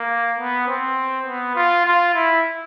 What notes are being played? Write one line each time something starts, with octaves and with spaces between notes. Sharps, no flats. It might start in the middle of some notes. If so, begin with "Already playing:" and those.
Already playing: A#3
B3
C4
B3
F4
F4
E4